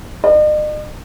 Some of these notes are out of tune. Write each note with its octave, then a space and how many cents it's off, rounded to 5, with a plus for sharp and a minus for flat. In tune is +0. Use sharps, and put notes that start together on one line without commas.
D#5 -45